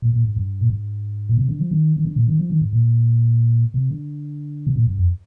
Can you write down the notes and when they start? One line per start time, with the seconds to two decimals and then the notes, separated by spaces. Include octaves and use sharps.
0.02 A#2
0.13 A#2
0.24 G#2
0.36 G2
0.61 A#2
0.70 G#2
1.29 A#2
1.37 C3
1.49 D3
1.60 F3
1.71 D#3
1.97 D#3
2.05 D3
2.16 A#2
2.28 D#3
2.39 F3
2.50 D#3
2.61 G#2
2.73 A#2
3.74 C3
3.91 D3
4.67 C3
4.76 A#2
4.87 G2
4.98 F2